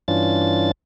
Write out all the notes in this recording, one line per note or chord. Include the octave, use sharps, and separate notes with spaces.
G2 E3 C#4 D4 F4 A6